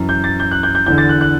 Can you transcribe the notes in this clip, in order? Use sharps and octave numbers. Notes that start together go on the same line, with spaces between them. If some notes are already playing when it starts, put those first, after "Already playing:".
Already playing: F#2 E3
G6
A6
G6
F#6
G6
G6
E2 D3 G6
A6
F#6
F#6